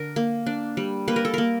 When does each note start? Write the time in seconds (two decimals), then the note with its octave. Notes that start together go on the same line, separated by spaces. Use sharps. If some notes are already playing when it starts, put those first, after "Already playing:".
Already playing: D3 D4 A#4
0.16 A#3
0.46 D4
0.77 G3
1.08 A#3 B4
1.16 A#4
1.25 A4
1.34 A#3 A#4